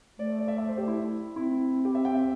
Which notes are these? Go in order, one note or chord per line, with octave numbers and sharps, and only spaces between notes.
A3 D5
D5
E5
E5
C5
G4
E4
C4 E4
G4
E5
G5
E5